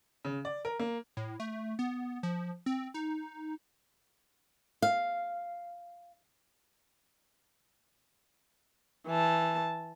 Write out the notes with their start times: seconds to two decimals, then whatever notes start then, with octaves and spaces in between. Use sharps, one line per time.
0.25 C#3
0.45 D5
0.65 A#4
0.80 A#3
1.17 A2
1.40 A3
1.79 B3
2.23 F3
2.66 C4
2.94 D#4
4.82 F5
9.07 E3 A5